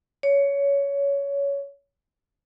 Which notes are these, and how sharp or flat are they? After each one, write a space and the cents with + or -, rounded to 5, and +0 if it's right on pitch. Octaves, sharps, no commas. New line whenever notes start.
C#5 +15